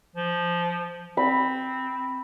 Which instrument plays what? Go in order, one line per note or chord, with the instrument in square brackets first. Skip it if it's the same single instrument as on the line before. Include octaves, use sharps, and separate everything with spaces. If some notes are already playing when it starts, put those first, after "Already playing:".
[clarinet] F3
[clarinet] C4 [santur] B5